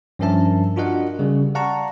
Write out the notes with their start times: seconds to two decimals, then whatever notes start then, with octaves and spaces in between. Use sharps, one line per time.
0.19 G2 F3 C#4 A#4 E5 A5
0.76 D4 F4 F#4 A#4 D#5 F#5
1.19 C#3 G3
1.55 D5 F5 F#5 A5 A#5 C#6